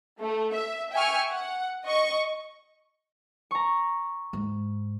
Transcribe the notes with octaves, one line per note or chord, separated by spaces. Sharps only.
A3
E5
E5 G5 G#5 C#6 F6
F#5
D#5 C#6
A#5 C#6
G#2